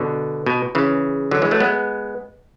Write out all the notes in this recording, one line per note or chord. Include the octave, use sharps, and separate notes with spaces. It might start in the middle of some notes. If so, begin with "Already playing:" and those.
Already playing: B2 D3
B2
C#3 E3
D3 F#3
E3 G#3
F#3 A3
G#3 B3